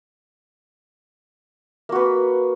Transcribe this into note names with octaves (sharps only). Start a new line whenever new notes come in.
A#3 F#4 B4